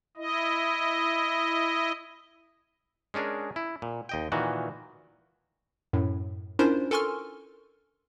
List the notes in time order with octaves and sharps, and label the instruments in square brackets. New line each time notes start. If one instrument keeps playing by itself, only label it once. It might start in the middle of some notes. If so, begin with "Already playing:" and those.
[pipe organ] E4 D#5
[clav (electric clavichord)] G#3 C#4 D4 G#4 A#4
E4
A#2
D#2 D#5 G5
A#2 D#3 E3 F#4
[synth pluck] F#2 A2
C#4 D4 E4 F4 A#4 C5
A4 A#4 G#5 C6 C#6 F6